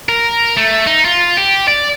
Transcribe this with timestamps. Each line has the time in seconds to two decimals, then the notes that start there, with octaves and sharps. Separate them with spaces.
0.09 A#4
0.57 A3
0.87 D#4
1.05 F4
1.37 G4
1.68 D5